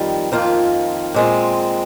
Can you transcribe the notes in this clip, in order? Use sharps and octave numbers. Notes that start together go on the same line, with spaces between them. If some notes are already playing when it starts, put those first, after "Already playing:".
Already playing: F2 D#3 G3
F2 D#3 A#3 F4
A#2 G#3 C4